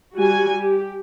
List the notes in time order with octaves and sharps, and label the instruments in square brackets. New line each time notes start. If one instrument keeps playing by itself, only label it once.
[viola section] G3 F#4 G#5
G4